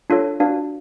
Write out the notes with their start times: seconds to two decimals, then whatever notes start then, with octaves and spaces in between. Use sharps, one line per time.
0.10 D4 F4 A4 C#5
0.40 D4 F#4 B4 D5 F5